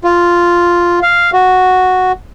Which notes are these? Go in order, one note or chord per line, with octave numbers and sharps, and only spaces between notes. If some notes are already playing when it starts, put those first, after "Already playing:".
F4
F5
F#4